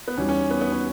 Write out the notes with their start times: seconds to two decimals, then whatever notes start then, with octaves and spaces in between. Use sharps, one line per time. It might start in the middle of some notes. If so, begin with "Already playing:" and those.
0.08 B3
0.17 E2 D#3 G3 C#4
0.29 C#4
0.51 B3
0.61 B3
0.72 C#4